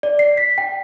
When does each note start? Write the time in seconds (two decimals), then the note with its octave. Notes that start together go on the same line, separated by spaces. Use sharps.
0.03 D5
0.19 C7
0.37 B6
0.58 G5